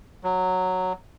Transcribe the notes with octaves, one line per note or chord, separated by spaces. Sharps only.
F#3